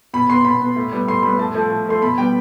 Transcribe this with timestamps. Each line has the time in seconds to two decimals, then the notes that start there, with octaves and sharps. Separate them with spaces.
0.14 B2 B5
0.30 B3 C6
0.45 B2 B5
0.61 B3
0.76 A2
0.92 G3 B3
1.08 A2 C6
1.23 G3 B3 B5
1.39 A2 A5
1.54 F3 A3
1.70 A2
1.86 F3 A3 C6
2.02 B2 B5
2.17 G3 B3 G5